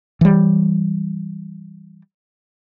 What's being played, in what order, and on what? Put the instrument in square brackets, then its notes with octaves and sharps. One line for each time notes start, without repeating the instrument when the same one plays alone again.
[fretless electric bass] E3 G3